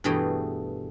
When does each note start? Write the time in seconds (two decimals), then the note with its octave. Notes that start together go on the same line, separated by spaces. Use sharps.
0.04 G2 B2 E3 A3 G#4 G5